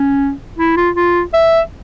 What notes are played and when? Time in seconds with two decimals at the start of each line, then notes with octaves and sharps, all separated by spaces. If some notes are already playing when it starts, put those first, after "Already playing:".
Already playing: C#4
0.59 E4
0.77 F4
0.96 F4
1.34 E5